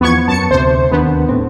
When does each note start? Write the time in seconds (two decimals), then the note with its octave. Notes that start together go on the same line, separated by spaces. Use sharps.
0.01 E2 F3 B3 C#6 G#6
0.28 F#2 A5 C#7
0.51 D2 C3 C5
0.91 D#2 D#3 B3 D4
1.29 D#1 A2 C4